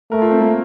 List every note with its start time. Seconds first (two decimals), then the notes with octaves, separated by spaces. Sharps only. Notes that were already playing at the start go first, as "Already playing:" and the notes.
0.11 A3 A#4
0.22 F4
0.31 C4
0.41 A#3